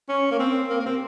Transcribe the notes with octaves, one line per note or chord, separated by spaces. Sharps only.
C#4
A#3
C4
A#3
A#3
C4